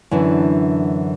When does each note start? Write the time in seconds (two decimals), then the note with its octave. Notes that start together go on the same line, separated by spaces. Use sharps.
0.11 F#2 D3 E3 D4